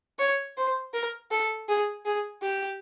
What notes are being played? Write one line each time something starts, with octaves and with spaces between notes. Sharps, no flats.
C#5
C5
A#4
A4
G#4
G#4
G4